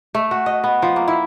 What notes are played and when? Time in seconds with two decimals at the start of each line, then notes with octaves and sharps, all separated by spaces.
0.15 A3
0.31 F#4
0.46 D#5
0.64 B3
0.82 F3
0.96 A#3
1.08 E4